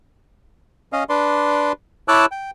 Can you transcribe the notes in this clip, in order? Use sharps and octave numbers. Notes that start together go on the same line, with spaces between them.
C#4 D#5 F5
D4 B4 D5 C6
E4 C#5 A5 D6 E6 F#6
G5